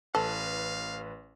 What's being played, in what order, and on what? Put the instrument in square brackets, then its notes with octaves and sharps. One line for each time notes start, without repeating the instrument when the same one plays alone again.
[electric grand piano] A1 B4 [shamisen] A4 [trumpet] F5